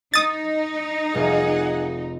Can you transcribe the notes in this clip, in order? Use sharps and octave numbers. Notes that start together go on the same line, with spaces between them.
D#4 D#6 A6
F1 G#4 F#5